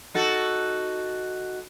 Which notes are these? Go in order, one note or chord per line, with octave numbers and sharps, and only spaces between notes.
D#4 F#4 A4